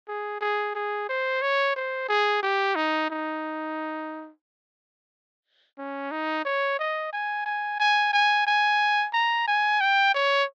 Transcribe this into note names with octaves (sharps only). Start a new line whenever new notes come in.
G#4
G#4
G#4
C5
C#5
C5
G#4
G4
D#4
D#4
C#4
D#4
C#5
D#5
G#5
G#5
G#5
G#5
G#5
A#5
G#5
G5
C#5